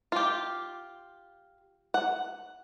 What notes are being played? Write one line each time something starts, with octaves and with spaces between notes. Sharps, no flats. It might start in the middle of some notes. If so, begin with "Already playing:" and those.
F4 G4
F#5